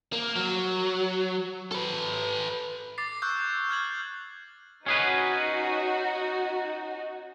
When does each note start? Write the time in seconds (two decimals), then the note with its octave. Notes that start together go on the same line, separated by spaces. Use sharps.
0.13 A#3
0.36 F#3
1.71 A4 B4
2.98 D6 A6 C7
3.22 C#6 E6 F#6 G6
3.70 F6 G6 G#6 F#7
4.86 C#4 D#4 F#4 G#4 B4